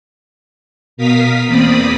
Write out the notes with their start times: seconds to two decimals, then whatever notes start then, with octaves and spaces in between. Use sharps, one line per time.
0.97 B2 A#4 F5 D#6 B6
1.47 E2 A#3 C4 D5 B5 D#6